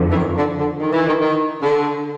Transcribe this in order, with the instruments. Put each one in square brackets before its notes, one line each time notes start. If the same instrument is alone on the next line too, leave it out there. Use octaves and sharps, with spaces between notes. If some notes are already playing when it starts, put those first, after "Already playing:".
Already playing: [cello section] F2 D3 F3
[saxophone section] E3
D#3
D3
D3
D#3
E3
D#3
D#3
D3